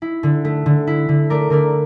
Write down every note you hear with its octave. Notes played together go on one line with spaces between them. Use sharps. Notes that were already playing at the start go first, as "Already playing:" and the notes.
E4
D3
A3
D3
E4
D3
A3 A#4 D5
D3 A#4 D5